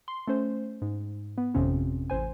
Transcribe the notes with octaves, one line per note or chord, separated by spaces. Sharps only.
C6
A3 C#4 C5
G#2
B3
G#1 F2 C3 C#4
A1 C5 G#5